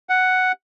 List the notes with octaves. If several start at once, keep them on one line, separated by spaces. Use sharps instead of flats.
F#5